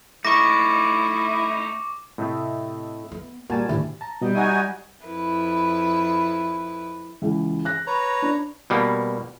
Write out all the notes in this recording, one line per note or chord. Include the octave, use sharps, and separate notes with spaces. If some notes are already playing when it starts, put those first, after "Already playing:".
A3 D#4 E4 C#6 D6 A#6
A2 C3 A3 D#5 E5
B3
A#2 G3 A#3 F#4 G#5 A5
D2 A2 D#3 E4 G4
A5 A#5
B2 G3 F#4 D#5
D#4 F#4 D#5 E5 G#5 D#6
F2 E4 B4
C#2 E3
F#6 A#6
B4 C#5 A#5
D4
B2 G3 A#3